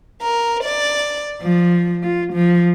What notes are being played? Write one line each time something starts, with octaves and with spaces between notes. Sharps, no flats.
A#4
D5
F3
F4
F3